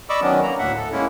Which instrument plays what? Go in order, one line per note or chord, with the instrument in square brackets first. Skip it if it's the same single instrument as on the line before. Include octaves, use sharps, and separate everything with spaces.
[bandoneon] D5 D#5 B5 C#6 D6 E6
D#3 F#3 B3 C#4 D4
A#3 A#5
D2 A2 E5 F#5
A4
G#3 A#3 C#4 E4